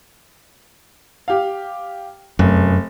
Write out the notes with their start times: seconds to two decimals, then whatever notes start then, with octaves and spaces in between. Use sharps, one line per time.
1.28 G4 F5
2.39 F1 F#2